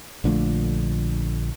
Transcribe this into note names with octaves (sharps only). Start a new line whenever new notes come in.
A#1 D3 F3 A3